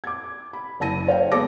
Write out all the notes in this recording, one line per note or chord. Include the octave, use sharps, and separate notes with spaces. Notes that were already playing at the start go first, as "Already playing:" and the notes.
D6 G#6
B5
F#1 E4 A5 A#6 D#7
C5 C#5 F5 G5
G#3 B3 A4 A5 D6 A#6